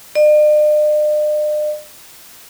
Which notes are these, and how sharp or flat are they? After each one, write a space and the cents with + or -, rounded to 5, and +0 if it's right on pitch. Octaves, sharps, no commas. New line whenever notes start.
D5 +45